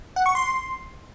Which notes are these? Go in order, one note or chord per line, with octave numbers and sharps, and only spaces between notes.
F#5
C#6
C6